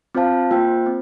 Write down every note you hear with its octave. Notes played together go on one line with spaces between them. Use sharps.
C4 F4 C5 F5 A5
A#3 F4 C5 G5
C4